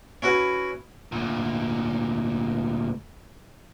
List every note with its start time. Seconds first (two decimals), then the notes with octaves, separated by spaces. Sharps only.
0.22 C#4 E4 F#4 B4
1.12 D2 A#2